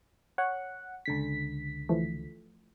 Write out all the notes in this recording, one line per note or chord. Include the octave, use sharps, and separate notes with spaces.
C#5 F#5
C#2 D3 B6
E3 F3 A3